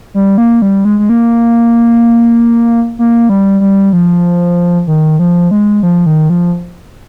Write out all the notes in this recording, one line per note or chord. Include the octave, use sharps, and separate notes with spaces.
G3
A#3
G3
G#3
G#3
A#3
A#3
G3
G3
F3
D#3
F3
G#3
F3
D#3
F3